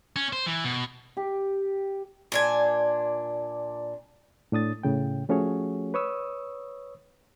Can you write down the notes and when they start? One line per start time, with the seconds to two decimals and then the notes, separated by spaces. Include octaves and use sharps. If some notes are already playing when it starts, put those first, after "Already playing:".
0.16 C#4
0.33 C5
0.46 E3
0.64 B2
1.17 G4
2.32 A#2 D4 G#5
4.52 A2 D4 D#6 A6
4.83 A2 C#3 G5
5.29 F3 A3 C#4 F#4 G#4 C#5
5.94 B4 C#5 C#6 D#6 E6